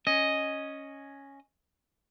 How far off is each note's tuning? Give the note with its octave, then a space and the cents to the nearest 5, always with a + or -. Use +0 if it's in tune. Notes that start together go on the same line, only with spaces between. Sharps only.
C#4 +0 D#5 +0